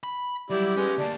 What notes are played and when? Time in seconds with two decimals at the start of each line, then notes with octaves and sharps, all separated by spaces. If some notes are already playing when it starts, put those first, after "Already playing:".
0.03 B5
0.50 F#3 G3 E4 G4 D5
0.77 G#3 B3 C#4
0.98 D2 A#3 D5 A5